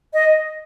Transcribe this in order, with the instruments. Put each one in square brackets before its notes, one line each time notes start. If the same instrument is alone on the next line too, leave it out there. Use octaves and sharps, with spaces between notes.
[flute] D#5